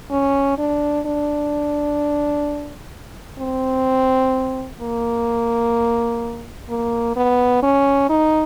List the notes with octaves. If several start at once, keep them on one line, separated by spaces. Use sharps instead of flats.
C#4
D4
D4
C4
A#3
A#3
B3
C#4
D#4